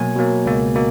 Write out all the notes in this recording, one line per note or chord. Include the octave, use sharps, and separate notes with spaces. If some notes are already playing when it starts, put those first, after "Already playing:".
Already playing: B2 F#3 A#3 G#5
B2 F#3 A#3
C#2 B2 A#3
B2 A#3